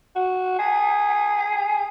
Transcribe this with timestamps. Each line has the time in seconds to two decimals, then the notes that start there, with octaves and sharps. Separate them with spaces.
0.15 F#4
0.59 G#4